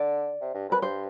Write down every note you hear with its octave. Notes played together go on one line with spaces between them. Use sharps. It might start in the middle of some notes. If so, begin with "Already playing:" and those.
Already playing: D3 D5
C3
G2
F2 B4
G2 C5